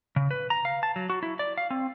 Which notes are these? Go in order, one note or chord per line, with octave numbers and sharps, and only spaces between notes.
C#3
B4
A#5
F5
A5
F#3
F#4
E4
D5
F5
C4